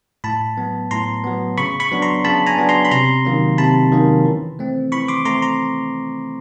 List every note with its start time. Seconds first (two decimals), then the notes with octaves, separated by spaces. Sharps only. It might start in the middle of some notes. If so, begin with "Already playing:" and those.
0.24 A2 A5 B5
0.57 F#3 B3
0.91 A2 A#5 C6
1.24 F#3 B3
1.57 C#3 B5 C#6
1.80 B5 C#6
1.91 F#3 B3 D4
2.02 A#5 C6
2.25 C#3 A5 B5
2.46 G#5 A#5
2.58 F#3 B3 D4
2.69 A#5 C6
2.85 B5
2.91 C3 A#5 C6
3.25 D#3 F#3 A#3 C#4
3.58 C3 A5 B5
3.92 D#3 F#3 A#3 C#4
4.25 E3
4.59 A3 C4
4.92 E3 B5 C#6
5.08 C6 D6
5.25 A3 C4 A#5 C6
5.42 A#5 C6